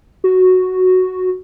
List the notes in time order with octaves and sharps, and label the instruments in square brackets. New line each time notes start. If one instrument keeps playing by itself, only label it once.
[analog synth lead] F#4